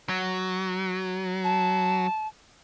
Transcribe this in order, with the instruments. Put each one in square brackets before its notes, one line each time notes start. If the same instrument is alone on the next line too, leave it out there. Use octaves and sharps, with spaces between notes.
[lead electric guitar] F#3
[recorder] A5